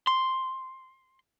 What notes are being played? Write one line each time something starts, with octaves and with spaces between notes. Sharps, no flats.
C6